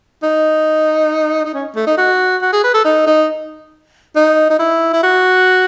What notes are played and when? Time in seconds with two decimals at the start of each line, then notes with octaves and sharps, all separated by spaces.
0.23 D#4
1.45 D#4
1.54 C#4
1.76 A3
1.87 D#4
1.97 F#4
2.42 F#4
2.53 G#4
2.64 B4
2.74 A4
2.85 D#4
3.07 D#4
4.16 D#4
4.50 D#4
4.59 E4
4.94 E4
5.03 F#4